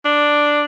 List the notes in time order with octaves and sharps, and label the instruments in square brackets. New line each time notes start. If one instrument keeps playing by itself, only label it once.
[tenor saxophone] D4